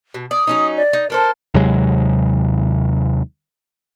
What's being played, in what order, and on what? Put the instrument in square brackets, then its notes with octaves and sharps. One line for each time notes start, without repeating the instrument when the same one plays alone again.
[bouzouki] B2
[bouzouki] D5 [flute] D#6
[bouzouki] F#3 C#4 D#4
[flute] D5
[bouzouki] D#4
[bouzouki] D4 A4 C5 [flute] A#4
[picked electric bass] D#2 C3 F#3 G#3